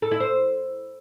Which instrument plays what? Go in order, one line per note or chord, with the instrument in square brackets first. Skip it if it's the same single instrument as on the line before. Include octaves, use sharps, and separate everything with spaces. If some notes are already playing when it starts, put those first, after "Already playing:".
[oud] A4
E4
C5